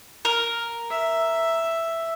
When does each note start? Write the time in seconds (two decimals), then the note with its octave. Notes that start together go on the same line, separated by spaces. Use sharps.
0.25 A#4
0.91 E5